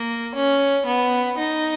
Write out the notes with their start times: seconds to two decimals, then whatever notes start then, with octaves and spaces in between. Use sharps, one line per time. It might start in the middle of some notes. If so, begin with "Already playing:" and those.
Already playing: A#3
0.35 C#4
0.86 B3
1.38 D#4